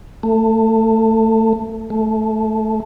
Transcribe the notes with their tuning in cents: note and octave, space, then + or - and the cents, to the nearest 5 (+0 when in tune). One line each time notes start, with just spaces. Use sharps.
A3 +20
A3 -10